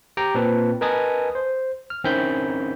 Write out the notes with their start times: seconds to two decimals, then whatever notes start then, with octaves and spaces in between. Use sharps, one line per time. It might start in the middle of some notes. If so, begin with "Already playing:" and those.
0.17 G4 G5 A#5
0.35 A#2 C4 B4 A5
0.81 A#4 B4 D#5 G#5 A5 D#6
1.35 C5
1.90 F6
2.04 D#3 C4 C#4 E4 B5 G6